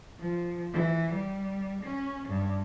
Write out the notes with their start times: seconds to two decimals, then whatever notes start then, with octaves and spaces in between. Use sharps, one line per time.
0.20 F3
0.73 E3
1.13 G3
1.84 C#4
2.29 G2